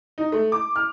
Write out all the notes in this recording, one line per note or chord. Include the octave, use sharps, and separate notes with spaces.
D#4
A3
D6
F6